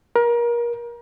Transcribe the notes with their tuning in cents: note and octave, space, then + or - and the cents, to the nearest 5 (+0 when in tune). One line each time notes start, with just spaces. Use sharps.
A#4 +30